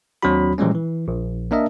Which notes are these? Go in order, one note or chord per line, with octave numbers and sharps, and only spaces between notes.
D#2 F#3 C4 D4 F#4 B5
A#2 E3 F3 G3 G#3 C#4
E3
A#1
A#3 D4 A#4 D#5 E5 A5